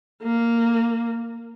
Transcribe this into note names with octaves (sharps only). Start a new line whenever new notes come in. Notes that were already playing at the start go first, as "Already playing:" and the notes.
A#3